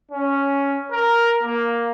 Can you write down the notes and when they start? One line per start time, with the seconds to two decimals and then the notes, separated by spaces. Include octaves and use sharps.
0.11 C#4
0.92 A#4
1.43 A#3